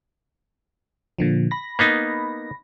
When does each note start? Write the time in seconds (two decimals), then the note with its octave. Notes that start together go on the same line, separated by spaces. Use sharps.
1.18 A#2 D3 F3
1.51 B5 A#6
1.79 A#3 B3 D#4